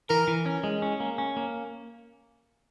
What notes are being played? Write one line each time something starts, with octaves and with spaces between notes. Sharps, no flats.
E3 A#4
E3
C#4
G#3
C#4
A#3
C#4
A#3